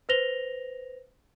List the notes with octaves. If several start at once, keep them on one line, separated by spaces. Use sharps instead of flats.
B4 C5 A#6 F7 G7